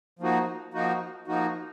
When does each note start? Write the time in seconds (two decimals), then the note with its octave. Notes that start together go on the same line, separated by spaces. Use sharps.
0.19 F3 A#3 D#4 F#4
0.74 F3 A#3 D#4 F#4
1.28 F3 A#3 D#4 F#4